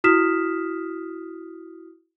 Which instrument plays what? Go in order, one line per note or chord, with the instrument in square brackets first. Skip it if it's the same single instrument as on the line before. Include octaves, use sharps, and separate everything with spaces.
[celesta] E4 F#4 D#6 F6 B6 E7